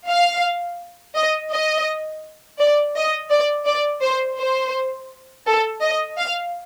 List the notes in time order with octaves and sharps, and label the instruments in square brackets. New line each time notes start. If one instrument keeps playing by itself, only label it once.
[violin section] F5
D#5
D#5
D5
D#5
D5
D5
C5
C5
A4
D#5
F5